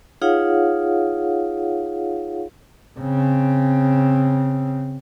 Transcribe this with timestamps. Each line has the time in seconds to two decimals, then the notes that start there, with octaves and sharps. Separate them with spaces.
0.22 D#4 F4 G#4 C#5 F5 F#5
2.99 C#3 C4